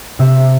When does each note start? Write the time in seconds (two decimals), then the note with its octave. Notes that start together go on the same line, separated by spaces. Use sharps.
0.19 C3 E5